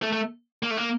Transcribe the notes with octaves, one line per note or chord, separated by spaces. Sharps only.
A3
A3
A#3
A3
A#3